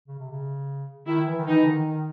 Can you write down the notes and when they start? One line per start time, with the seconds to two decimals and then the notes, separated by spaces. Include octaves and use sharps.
0.08 C#3
0.19 C3
0.32 C#3
1.07 D#3 E4
1.27 E3
1.38 D#3
1.47 E3 D#4
1.63 D3
1.66 D#3
1.86 D#3